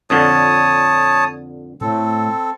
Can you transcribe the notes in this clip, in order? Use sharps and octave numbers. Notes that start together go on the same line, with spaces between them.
F2 A#2 D3 C#5 A5 D#6
A2 C4 A4